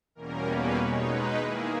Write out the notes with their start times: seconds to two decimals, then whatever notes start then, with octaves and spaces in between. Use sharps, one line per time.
0.15 E2 B2 G3 A#3 C#4 A#4
0.46 B4
0.75 B2 G#3 D#4 C#5
1.06 B4
1.36 D#3 A#3 E4 G#4